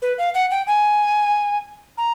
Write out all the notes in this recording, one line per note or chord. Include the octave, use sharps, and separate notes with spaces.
B4
F5
F#5
G5
G#5
A#5